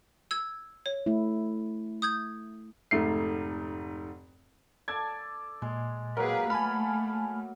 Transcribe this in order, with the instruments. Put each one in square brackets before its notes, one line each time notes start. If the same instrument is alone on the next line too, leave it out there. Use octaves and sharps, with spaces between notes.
[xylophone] E6 G#6
C#5
[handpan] A3 E4
[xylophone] D#6 G6 G#6
[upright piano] F1 G#2 A3 C7
[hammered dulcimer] A4 D5 [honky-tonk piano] G#6
[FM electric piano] A#2 [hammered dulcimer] G#3
[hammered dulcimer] F#3 A#3 [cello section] G#4 B4 [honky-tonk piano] A#4
[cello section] A3 [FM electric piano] G#5 A5 F6 [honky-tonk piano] B5